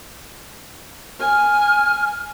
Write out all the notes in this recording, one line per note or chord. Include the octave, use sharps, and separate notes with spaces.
G#5 F6